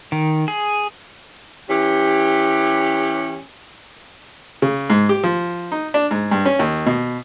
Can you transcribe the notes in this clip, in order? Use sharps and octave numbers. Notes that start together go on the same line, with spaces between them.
D#3
G#4
E3 C#4 G4
C#3
G#2
G4
F3
D#4
D4
G#2
G2
C#4
D#2
B2